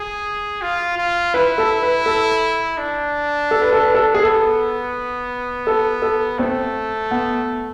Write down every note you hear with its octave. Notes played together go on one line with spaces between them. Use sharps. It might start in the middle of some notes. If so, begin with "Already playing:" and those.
Already playing: G#4
F4
F4
E4 B4
A4
B4
A4
D4
A4
B4
A4
B4
A4
G#4
B3 A4
A4
A4
A3 C4
B3